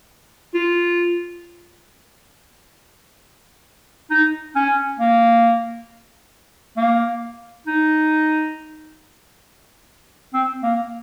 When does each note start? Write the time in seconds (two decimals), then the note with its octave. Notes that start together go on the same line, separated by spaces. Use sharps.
0.54 F4
4.10 D#4
4.55 C#4
4.99 A#3
6.77 A#3
7.67 D#4
10.34 C4
10.63 A#3